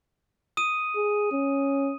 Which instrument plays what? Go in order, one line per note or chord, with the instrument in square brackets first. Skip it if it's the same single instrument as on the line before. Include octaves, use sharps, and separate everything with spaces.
[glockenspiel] D#6 D#7
[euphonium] G#4
C#4